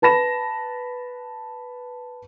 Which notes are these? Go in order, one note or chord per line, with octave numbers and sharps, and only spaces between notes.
B4 A5 B5 A#6 E7